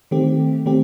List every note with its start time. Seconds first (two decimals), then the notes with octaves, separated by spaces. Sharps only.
0.11 D#3 A3 C4 G4
0.66 D#3 A3 C4 G4